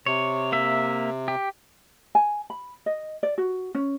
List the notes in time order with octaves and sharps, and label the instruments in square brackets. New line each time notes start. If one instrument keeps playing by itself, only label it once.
[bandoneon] C3 [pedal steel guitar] C#5
[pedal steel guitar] A#3 E5
G4
[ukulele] G#5
B5
D#5
D5
F#4
C#4